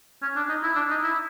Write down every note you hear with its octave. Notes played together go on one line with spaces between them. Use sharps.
C#4
D4
D#4
E4
D4
D#4
E4